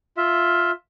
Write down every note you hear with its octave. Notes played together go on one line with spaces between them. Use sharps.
F4 E5